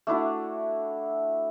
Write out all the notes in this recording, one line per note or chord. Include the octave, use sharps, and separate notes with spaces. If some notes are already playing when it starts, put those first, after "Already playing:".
A3 D4 E4 F#4